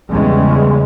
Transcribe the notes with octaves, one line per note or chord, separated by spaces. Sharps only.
E2 C#3 G3 G#3 C#4